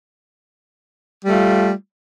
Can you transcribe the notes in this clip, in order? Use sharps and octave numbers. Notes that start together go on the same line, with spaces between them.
G3 A3 F4